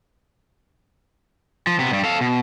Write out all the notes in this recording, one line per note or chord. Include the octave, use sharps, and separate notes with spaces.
F3
C3 B3
G2 G3
A4 F5
B2